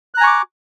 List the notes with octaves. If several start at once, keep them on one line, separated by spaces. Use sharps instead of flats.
G#5 A#5 C#6 D6 F#6